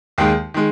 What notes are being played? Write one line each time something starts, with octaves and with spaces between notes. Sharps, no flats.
D#2 D#3 G#3
D#3 G#3